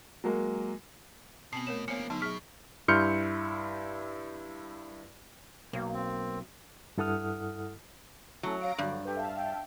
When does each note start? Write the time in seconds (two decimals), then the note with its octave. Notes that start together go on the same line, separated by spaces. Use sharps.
0.24 F#3 G#3 A#3
1.53 B2 B3 C4 A5 C7 F#7
1.67 A3 A#4 C#5 E7
1.88 F3 A#3 B3 C#5 G#5 C#7
2.10 D3 F#3 B3 D#4 A5
2.22 B2 F#3 G#4 F6 B6
2.88 G2 E4 C6 F6 G6 C#7
5.73 B1 A#3
5.93 C4
6.98 G2 E4 A4 F#5 D#6 F6
8.43 F#3 A3 C#4 E4 A4
8.61 C#5 F5 A#6 D7
8.78 G2 D3 F#3 F#4 D5
9.05 G4 A4 B4
9.17 E5 F5 A5
9.35 G5